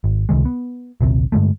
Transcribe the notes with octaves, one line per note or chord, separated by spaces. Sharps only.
G#1
C#2 C3 D#3 G#3
B3
A#1 D#2 C3
G2 D3 G#3 A3